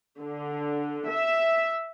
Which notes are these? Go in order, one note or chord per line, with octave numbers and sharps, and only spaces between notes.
D3
E5